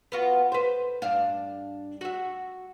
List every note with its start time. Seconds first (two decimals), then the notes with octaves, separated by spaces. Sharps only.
0.12 B3 F4 F#4
0.52 B4 C5
1.02 G2 D4 F5
2.01 F#4 E5